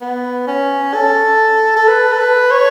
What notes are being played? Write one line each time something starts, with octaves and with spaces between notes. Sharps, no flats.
B3
C#4
A4
A4
B4
A4
B4
C#5